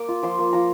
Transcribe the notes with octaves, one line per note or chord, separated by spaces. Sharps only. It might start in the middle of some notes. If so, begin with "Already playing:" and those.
Already playing: A#3 D6
F4
F3 C6
A#3
F3 A#5